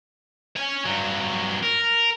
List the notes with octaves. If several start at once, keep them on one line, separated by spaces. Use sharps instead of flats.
C#5 G#5
G2 F#3
A#4